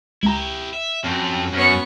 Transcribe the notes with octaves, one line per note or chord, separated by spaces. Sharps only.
C#2 E4 G4 A#5
E5
F2 C4 C#4 F#4
F#2 B3 C#5